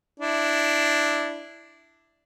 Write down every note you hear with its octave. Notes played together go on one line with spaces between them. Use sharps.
D4 E4